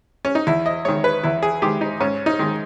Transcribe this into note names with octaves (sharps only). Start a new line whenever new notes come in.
C#4
D#4
E2 E4
D#5
D#3 G#3 C#5
B4
E2 E4
G#4
D#3 G#3 G4
D#4
G#2 C#4
D#4
D#3 G#3